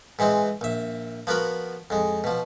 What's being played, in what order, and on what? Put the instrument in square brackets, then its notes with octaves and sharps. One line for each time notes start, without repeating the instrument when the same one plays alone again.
[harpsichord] G#2 E3 G#3 C4
A#1 E5
F3 B3 F#4 A#4 B5
F2 G#3
B2 F3